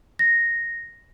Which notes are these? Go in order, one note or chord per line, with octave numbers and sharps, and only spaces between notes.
A#6